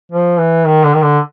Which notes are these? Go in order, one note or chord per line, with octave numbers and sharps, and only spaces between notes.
F3
E3
D#3
D3
D#3
D3